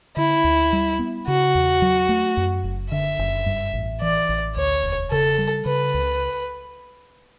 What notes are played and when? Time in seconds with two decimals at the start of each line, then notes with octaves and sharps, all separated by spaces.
0.17 D3 E4
0.44 D2
0.73 G3
0.99 B3
1.27 C#3 F#4
1.55 E2
1.82 F#3
2.09 A3
2.37 F#2
2.64 F#1
2.92 D3 E5
3.19 F#1
3.46 G2
3.73 A1
4.02 E3 D5
4.29 A1
4.56 D2 C#5
4.83 E1
5.11 C#3 A4
5.38 G3
5.66 C#3 B4
5.94 C#2